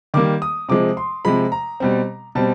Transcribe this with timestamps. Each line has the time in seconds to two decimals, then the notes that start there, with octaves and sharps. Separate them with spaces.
0.14 D#3 G3 A#3 D6
0.42 D#6
0.69 C3 F3 G#3 D6
0.97 C6
1.25 C3 F3 G#3 B5
1.52 A#5
1.80 B2 G3 C4
2.35 B2 G3 C4 A5